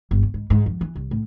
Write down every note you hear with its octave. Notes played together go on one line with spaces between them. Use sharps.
G1
G2
G#2
G#2
F2
E3
C2
A2